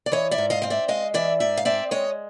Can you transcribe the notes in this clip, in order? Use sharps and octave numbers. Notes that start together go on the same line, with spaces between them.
D5
E3 C#5 D#5
D5 E5
G#2
D#5 F5
C4 F5
D5 E5
G#3 D#5 F5
E3 D5 E5
G#2 D5 E5
F5
C4 D5 E5
G#3 C#5 D#5